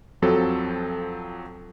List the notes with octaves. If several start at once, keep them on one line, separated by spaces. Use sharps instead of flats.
F2 F3 F#3 C4 A4